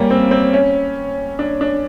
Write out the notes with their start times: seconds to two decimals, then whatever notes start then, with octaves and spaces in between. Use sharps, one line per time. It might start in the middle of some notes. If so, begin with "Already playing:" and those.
Already playing: G3 A#3 C#4
0.10 C4
0.31 C4
0.53 C#4
1.39 D4
1.61 D4